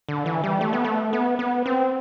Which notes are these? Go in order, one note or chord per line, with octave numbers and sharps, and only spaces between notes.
D3
E3
G3
A3
B3
A3
B3
B3
C4